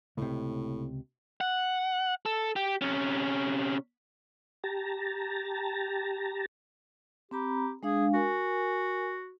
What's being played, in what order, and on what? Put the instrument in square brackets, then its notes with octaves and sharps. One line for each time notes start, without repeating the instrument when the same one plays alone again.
[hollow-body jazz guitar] C#2 C3 [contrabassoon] A2
[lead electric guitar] F#5
A4
G4
C3 C#4
[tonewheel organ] G4 A5 A#5
[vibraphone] C4 A#5 B5 [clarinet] G4
[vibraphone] G#3 D4 F5 [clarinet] G#4
[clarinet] F#4 [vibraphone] A#4 G#5